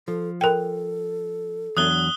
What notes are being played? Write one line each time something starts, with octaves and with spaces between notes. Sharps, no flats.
F3 A4
A4 A#4 G5
E2 F#3 D4 D#6 F#6 G7